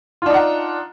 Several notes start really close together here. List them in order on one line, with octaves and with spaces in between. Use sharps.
F4 D4 D#4 F#5